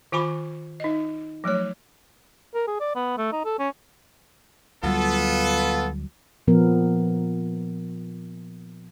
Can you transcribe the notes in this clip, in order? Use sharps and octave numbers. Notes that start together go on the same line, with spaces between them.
D#3 F4 G#5 B5 C#6
D#4 D#5
F3 F#3 A3 C#5
A#4
G#4
D5
B3
A3
D#4
A4
C#4
D2 F#3 G3 B3 F4 A4
A#2 F3 B3 A#4